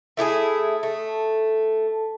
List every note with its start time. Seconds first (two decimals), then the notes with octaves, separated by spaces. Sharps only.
0.17 A3 E4 G4 G#4
0.83 A3